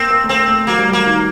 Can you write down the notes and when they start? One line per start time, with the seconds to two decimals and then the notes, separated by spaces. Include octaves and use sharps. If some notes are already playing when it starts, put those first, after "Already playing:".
Already playing: A#3 C4
0.10 A#3
0.24 A3
0.29 A#3 C4
0.48 A3
0.67 F#3 A#3
0.78 G3
0.90 F#3 A#3
1.06 D#3